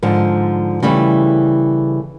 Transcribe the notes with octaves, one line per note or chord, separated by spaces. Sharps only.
G#2 D3 F3
C#3 E3 G3 A3